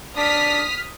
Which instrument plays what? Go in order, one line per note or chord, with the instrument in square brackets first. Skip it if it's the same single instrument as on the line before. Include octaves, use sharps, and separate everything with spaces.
[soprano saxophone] D4 [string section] D#6 F6 B6